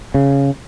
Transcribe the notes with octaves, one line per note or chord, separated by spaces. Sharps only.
C#3